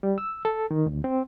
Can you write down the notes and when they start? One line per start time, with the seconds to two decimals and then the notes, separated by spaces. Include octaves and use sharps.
0.03 G3
0.18 E6
0.45 A4
0.71 D#3
0.86 D2
1.04 C4